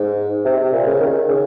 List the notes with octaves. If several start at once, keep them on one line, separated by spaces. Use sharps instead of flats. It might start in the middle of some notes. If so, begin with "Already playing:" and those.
Already playing: G#2
C3
C3
A#2
C#3
D#3
C#3